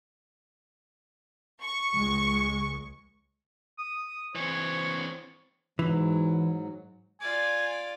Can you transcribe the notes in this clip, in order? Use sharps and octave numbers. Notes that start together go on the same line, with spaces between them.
C#6
C#2 G#3
D#6
E3 C4 C#5
G#2 E3 F#3
F4 D5 G#5